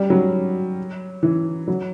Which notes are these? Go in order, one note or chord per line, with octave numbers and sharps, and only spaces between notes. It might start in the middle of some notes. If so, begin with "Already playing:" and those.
Already playing: G3
F#3
E3
F#3